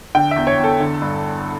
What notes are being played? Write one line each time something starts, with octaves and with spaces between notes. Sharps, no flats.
D3 G5
E2 E5
C#5
E2
A4
D3
G2